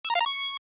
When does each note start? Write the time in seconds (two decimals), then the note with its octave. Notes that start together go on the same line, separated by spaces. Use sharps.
0.05 E6
0.10 A#5
0.15 F5
0.21 A#5
0.26 C#6